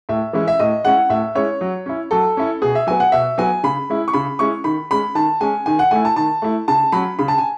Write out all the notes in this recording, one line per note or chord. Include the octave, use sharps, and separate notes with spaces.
A2 E5
E3 G#3 C#4 E4
E5
A2 D#5
G#3 C#4 E4 F#5
A2 E5
G#3 C#4 E4 C#5
F#3
C#4 E4
F#3 A4
C#4 E4
B2 G#4
E5
F#3 B3 G#5
F#5
B2 E5
F#3 B3 G#5
C#3 B5
G#3 C#4 E4
C#6
C#3 B5
G#3 C#4 E4 C#6
D#3 B5
G#3 C#4 B5
D#3 A5
G#3 C#4 G#5
D#3 G#5
F#5
A3 E4 G#5
A5
D#3 A5
A3 E4
C#3 A5
F#3 C#4 B5
C#3 B5
A5
G#5